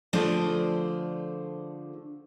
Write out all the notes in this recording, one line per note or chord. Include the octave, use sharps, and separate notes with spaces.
D3 F3 A3 G#4 C5 D5